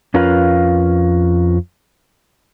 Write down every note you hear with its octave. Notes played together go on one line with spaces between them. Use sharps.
F2 C#4 F4 A#4 B4 F5